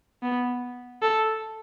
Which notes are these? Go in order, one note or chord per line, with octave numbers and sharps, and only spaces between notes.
B3
A4